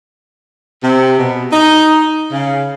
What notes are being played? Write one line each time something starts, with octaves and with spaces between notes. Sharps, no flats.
C3
B2
D#4
C#3